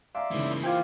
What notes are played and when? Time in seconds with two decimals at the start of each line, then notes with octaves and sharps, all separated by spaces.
0.15 D5 E5 F5 G#5 A#5 C6
0.31 C#3 E3 G#3 A#3 D#4
0.63 F4 C5 G5 D6 G#6